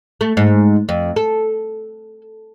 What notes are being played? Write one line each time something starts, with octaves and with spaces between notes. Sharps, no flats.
A3
G#2
F2
A4